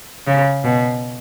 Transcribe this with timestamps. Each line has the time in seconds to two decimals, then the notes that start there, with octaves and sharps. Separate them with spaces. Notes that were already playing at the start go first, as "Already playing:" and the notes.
0.27 C#3
0.64 B2